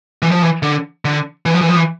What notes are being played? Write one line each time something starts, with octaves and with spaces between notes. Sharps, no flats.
E3
F3
E3
D3
D3
E3
F3
E3
F3
E3